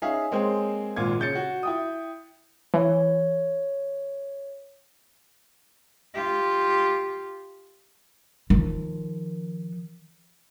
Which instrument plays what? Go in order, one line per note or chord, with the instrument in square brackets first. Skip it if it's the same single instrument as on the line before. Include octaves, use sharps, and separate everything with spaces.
[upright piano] C#4 D#4 G#4 C#5 E5 F5
G#3 A#3 C4 G#4 C5 C#5
G#1 A#2 F4 G#6
C#3 C#5 G6 A6 C#7
F#4
E4 G5 D#6
[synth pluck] E3 [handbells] C#5
[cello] F4 G4
[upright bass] D#3 F3